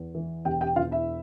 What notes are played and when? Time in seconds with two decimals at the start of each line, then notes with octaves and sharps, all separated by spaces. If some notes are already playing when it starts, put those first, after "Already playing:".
Already playing: E2
0.15 E3
0.45 E1 G4 G5
0.61 G4 G5
0.76 E1 F4 F5
0.91 E4 E5